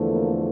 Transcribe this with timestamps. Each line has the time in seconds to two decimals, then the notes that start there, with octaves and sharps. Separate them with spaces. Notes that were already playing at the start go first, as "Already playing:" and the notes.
Already playing: E2 D3 F3 A3
0.11 A#3